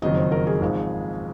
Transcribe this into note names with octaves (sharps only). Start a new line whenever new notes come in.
F#1 F2 D#3 F#3 D#5
C5
A#4
G#4
G#1 G#2 F3